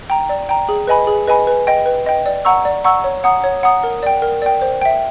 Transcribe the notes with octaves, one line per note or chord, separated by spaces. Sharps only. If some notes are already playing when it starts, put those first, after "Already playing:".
G5 A#5
D5
G5 A#5
G#4
B4 D#5 G#5 B5
G#4
B4 D#5 G#5 B5
B4
D#5 G5
B4
D#5 G5
D5
F#5 A#5 C#6 E6
D5
F#5 A#5 C#6 E6
C#5
F#5 A#5 D#6
C#5
F#5 A#5 D#6
A#4
D5 G5
A#4
D5 G5
C5
E5 G5